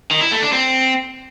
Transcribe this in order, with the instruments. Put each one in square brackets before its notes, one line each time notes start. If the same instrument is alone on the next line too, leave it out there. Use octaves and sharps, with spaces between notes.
[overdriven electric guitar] D#3
E4
A3
D4
C4